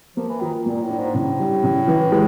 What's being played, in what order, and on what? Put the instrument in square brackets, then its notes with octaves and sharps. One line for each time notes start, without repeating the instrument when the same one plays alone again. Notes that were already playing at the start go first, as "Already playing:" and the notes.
[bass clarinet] F3 [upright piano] A#3
[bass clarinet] E3
[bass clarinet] D#3 [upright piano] F4
[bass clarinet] A#2 [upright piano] A#3
[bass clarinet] A2
[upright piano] D4
[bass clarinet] G#2
[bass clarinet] A2 [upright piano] C#3
[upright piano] G3
C#3
E3
G#3